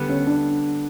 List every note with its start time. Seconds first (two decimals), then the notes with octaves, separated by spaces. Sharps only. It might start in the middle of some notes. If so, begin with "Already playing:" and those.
Already playing: D3 G3 B3
0.09 C#4
0.27 D4